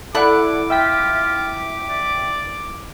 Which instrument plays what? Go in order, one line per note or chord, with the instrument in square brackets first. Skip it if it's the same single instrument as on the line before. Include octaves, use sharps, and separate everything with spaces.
[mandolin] E4 F#6 [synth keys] A4 D5 F#5 [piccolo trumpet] D6
[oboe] F4 [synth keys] E5 G5 B6
[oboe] D5